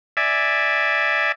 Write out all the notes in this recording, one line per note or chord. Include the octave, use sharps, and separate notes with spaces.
D5 E5 G#5